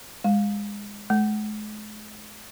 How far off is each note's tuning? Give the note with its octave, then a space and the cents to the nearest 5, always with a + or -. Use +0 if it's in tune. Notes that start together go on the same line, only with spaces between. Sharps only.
G#3 -20
G#3 +45